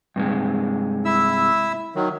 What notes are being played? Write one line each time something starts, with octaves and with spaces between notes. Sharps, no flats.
G2 C3 G#3
E4 E5 E6
D#3 F#3